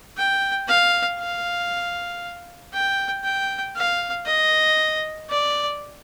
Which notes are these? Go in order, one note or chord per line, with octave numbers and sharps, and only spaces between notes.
G5
F5
F5
G5
G5
F5
D#5
D5